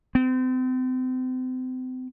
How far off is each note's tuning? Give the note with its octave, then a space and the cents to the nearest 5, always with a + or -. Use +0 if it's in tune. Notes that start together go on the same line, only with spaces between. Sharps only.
C4 -35